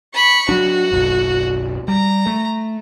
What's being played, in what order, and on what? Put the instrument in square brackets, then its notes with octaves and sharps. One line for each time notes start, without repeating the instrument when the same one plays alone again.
[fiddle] B5 C#6
[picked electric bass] F#3 D4 [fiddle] F#4
[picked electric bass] F#1 B1
[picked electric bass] G3 [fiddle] A#5
[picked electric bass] A3